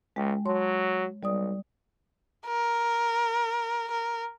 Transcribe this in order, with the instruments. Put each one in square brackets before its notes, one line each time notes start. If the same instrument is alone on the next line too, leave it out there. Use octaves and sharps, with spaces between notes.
[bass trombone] C#2 [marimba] G#3 G5
[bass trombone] F#3 [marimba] C#5 A5 C6
[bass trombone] B1 [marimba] G3 D5 D#6
[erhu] A#4
A#4